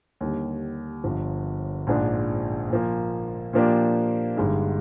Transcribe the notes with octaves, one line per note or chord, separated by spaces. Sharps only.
D#2 D3 G3
G1 G2 F3
A#1 G#2 F3 G#3 D4
A#2 F3 A#3
A#2 F3 A#3 D4 G4
G1 G2 D3 G#3 D#4